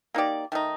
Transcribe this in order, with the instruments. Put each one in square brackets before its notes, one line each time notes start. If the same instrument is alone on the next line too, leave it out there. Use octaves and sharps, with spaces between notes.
[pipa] A#3 D#4 G4 D5
D#3 A3 D#4